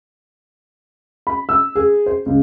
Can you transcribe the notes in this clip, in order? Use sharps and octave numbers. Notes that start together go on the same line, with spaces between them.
B5
E6
G#4
C5
C#2